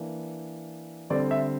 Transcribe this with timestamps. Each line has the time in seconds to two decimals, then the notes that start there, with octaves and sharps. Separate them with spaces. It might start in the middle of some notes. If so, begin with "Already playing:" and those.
Already playing: E3 A#3 D4
1.10 D3 G3 C4 D5
1.31 E5